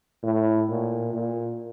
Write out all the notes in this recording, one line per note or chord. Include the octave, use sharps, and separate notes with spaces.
A2
A#2
A#2